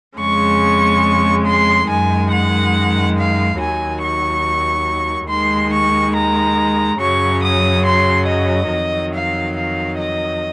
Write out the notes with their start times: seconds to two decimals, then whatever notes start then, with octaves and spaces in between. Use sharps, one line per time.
0.19 F2 C#3 G#3 C#6
1.46 C6
1.89 F#2 D#3 G#3 G#5
2.32 F#5
3.18 F5
3.60 D#2 D#3 F#3 G#5
4.03 C#6
5.30 D#2 D#3 G#3 C6
5.73 C#6
6.16 A#5
7.00 F#2 C#3 F#3 C#6
7.43 D#6
7.85 C6
8.28 D#5
8.72 F2 D#3 F#3
9.14 F5
9.57 F5
9.99 D#5